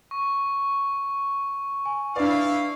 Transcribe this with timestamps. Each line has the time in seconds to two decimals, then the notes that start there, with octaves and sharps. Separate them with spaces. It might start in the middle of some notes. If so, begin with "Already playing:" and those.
0.11 C#6
1.86 G#5
2.16 D4 E4 B4 D5 F5